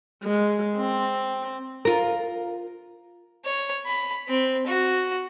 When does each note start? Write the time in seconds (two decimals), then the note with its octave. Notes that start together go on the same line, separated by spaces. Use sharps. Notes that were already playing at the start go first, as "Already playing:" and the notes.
0.24 G#3
0.76 C4
1.85 F4 A#4
3.45 C#5
3.86 B5
4.28 C4
4.67 F#4